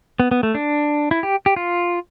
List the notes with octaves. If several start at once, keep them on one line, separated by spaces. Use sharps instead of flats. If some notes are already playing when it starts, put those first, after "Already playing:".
B3
B3
A3
D4
E4
G4
G4
F4